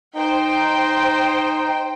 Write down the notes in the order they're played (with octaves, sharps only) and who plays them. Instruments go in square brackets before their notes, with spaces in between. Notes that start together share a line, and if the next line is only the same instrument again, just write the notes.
[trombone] D#4 [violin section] C5 G5